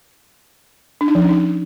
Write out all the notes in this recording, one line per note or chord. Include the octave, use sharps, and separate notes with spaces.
D4
D#4
F3
C#4
D#4